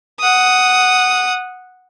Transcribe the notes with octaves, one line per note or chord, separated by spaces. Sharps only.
F#5 D#6